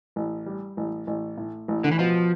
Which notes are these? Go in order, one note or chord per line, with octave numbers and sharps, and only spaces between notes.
A1
G3
A1
A1
A2
A1
D3
E3
B2 F3